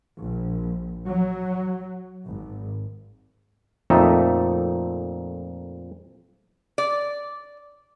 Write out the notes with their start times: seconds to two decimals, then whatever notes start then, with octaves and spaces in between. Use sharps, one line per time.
0.21 A#1
1.07 F#3
2.26 G#1
3.90 F2 A#2 A3 D#4 A4 E5
6.78 D5